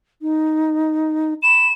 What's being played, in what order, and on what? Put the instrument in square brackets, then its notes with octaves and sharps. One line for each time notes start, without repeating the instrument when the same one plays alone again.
[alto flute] D#4
[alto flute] B5 [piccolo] E7